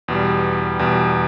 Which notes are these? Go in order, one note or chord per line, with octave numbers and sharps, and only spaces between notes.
E2 B2 G3
E2 B2 G3